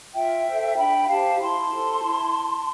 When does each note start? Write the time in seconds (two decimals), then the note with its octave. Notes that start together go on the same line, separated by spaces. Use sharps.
0.15 F4 E5 G5
0.46 A4 C5
0.78 D4 G5 B5
1.09 G4 C5 F5 A5
1.40 E4 A5 C6
1.72 A4 C5
2.03 E4